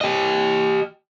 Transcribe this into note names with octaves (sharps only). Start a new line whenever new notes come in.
G4 D#5